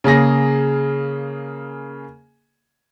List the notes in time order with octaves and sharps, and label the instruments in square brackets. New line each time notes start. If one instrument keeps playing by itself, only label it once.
[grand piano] C#3 A#3 G#4 A#6